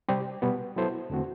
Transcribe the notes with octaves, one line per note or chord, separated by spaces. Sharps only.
C3 G3 C4 G4
B2 G3 B3
F#3 B3 E4 A4 C5
E2 D3 A3 C4 F#4